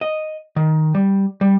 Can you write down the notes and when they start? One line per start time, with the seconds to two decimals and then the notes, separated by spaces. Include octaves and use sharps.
0.01 D#5
0.56 D#3
0.95 G3
1.41 G3